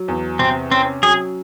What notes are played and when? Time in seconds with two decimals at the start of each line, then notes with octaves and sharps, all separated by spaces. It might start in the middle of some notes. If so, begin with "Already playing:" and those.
Already playing: F#3
0.08 E2
0.39 C3 C4
0.71 C4 C#4
1.03 F#3 G#4